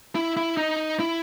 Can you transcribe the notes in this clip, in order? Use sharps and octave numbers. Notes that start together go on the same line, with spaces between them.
E4
E4
D#4
E4